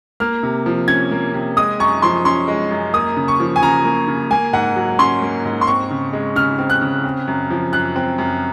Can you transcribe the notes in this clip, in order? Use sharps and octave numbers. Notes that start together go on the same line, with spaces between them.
A#3 F6
C3
F3
C#4 G#6
A#3
C3
G#3 D#6
F#2 C#6
F3 C6
C#4 C6
G#3
F#2
A#3 D#6
C#3
C#6
F3
G#5
C#3 A#5
A#3
C#3
A#3 G#5
G#2 F#5
F#3
C#4 C6
A#3
G#2
C6
C4 C#6
C#3
G#3
C#3 F6
C4
F#6
C#3
C4
F#2
F3
F#2 F#6
C4
F#2